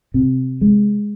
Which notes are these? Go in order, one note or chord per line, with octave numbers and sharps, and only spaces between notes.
C3
G#3